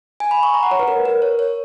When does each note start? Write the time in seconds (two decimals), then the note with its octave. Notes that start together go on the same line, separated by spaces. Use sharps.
0.20 G#5
0.31 B5
0.43 C#6
0.54 A#5
0.63 F#5
0.71 C#5
0.79 B4
0.88 A#4
1.05 A#4
1.22 C#5
1.39 C#5